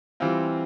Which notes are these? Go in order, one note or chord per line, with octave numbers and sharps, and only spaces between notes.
E3 G3 C4 F4